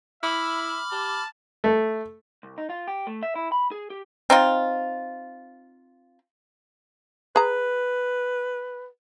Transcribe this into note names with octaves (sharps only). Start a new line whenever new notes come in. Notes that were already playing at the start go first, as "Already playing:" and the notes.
E4 E5 B5 D6 F6
G4 A5
A3
C2
D#4
F4
G4
A3
E5
E4
B5
G#4
G4
C4 D#4 F4
G#4 B4 A#5